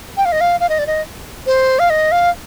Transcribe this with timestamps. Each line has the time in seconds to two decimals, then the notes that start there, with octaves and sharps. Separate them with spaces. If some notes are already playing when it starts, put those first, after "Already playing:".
0.17 G5
0.25 F5
0.32 D#5
0.41 F5
0.60 F5
0.69 D#5
0.79 D5
0.87 D#5
1.47 C5
1.79 F5
1.90 D#5
2.12 F5